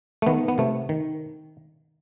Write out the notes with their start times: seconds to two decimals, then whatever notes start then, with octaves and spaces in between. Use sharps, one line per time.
0.22 A3
0.26 D#3 B3
0.48 B3
0.58 C3 A3
0.89 D#3